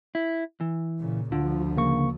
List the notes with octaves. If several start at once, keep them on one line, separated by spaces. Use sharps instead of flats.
E4
E3
A#2 C#3
D2 D3 F3 F4
C#3 A#3 C#6